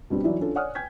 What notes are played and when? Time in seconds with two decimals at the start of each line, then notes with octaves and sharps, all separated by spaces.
0.10 B2 G3 C4 D4
0.24 E3 F#3 D#4 E4 F#4 D5
0.41 C#4 D4 F4 A4
0.55 C#5 D5 F#5 G#5 D#6 F6
0.75 G5 G#5 G6 G#6 B6